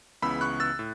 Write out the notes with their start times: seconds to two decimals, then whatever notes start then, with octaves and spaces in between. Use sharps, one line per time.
0.22 C#2 C#3 E3 B3 B5 E6
0.41 C#6 F#6
0.60 E6 A6
0.79 A2